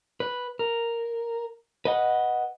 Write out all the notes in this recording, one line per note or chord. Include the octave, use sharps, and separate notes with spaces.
B4
A#4
B4 D#5 F#5